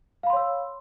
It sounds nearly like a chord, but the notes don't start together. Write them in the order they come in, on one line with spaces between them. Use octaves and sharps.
F5 B5 C6 C#5 E6